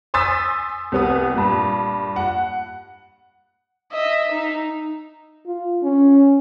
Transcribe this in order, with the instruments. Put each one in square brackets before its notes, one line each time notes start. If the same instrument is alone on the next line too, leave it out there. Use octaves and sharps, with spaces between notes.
[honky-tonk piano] G#5 C6 D#6 E6 A6 B6
C2 B3 D#6
G2 A#2
F#5
[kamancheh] D#5 E5
D#4
[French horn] F4
C#4